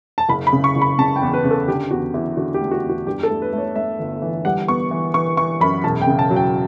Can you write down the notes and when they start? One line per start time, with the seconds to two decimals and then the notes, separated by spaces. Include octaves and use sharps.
0.18 A5
0.29 F#1 B5
0.47 B5
0.53 C#3
0.64 C#6
0.76 F#1
0.82 B5
0.98 C#3 A5
1.16 G5
1.22 E2
1.34 B4
1.45 C#3
1.51 A4
1.67 D3 G4
1.91 E2 F#4
2.14 E2 E4
2.37 D3 F#4
2.54 G4
2.61 A3
2.71 F#4
2.83 E2
2.89 F#4
3.07 G2 G4
3.23 A4
3.30 A3
3.42 B4
3.53 A3
3.58 C#5
3.75 A3 E5
3.99 G1
4.22 E3
4.45 G3 F#5
4.68 B3 C#6
4.91 E3
5.14 E3 C#6
5.37 E3 C#6
5.60 F#2 B5
5.84 E1 A5
6.02 G5
6.07 C#3
6.19 A5
6.30 F#3
6.36 G5